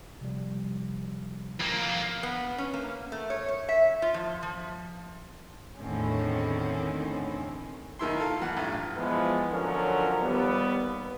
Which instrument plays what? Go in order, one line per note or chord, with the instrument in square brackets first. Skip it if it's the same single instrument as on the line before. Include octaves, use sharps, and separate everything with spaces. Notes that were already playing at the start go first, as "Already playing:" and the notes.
[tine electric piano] C3 F3 G3
[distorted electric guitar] F2 A#3
[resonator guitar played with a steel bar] B3
C#4
A#3
A3
C#5
C#5
E5
F4
F3
F3
[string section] E2 A2 D3 D#3 C4 C#4
[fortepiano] D#2 D#3 E4 C6
F4 A4 F5
E3 F#5
A1 G2 F4
[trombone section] E3 F3 G#3 B3
D3 F3 F#3 C#4 A#4
D#2 G3 B3